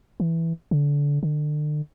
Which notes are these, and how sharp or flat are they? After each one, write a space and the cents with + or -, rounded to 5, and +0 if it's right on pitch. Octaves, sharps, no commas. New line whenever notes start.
E3 +0
D3 -25
D3 +35